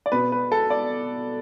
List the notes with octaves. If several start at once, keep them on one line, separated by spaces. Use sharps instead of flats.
D5
B2 B3 B4
B4
A4
D5